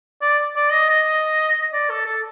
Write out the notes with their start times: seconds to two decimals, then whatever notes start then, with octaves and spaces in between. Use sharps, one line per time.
0.22 D5
0.56 D5
0.72 D#5
0.90 D#5
1.73 D5
1.90 A4
2.06 A4